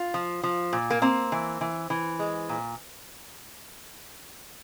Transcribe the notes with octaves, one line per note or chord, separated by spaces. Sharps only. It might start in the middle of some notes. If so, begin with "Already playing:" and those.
Already playing: F4
F3
F3
A#2
A#3
A#3 C4
E3
E3
E3
G#3
A#2